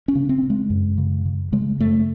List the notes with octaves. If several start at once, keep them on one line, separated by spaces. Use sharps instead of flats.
C#4
C#3
C4
C#3
G#3
F#2
C#3
C#3
C#3 G#3
F#2 A3